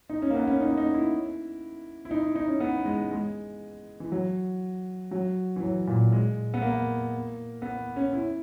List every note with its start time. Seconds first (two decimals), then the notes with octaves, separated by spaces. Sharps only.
0.09 D#4
0.22 C#4
0.30 A#3
0.35 B3
0.47 C#4
0.61 D#4
0.77 D#4
0.94 E4
2.05 E4
2.11 D#4
2.23 E4
2.36 D#4
2.48 C#4
2.60 B3
2.85 G#3
3.12 G#3
4.00 E3
4.12 F#3
5.11 F#3
5.56 E3
5.62 F#3
5.87 A#2
6.12 G#3
6.54 B3
6.62 A#3
7.62 B3
7.96 C#4
8.13 E4